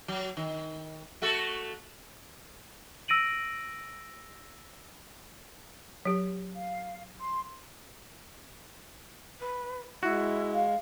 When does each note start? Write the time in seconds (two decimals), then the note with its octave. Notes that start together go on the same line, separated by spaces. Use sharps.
0.08 F#3
0.37 D#3
1.22 A3 F#4 A4
3.08 E6 A#6 D7 D#7 F#7
6.05 F#3 G4
6.55 F5
7.20 C6
9.41 B4
10.03 G#3 E4 F#4
10.54 F5